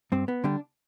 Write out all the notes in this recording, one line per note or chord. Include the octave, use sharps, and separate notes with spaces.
G2 C4
B3
D3 G3 D4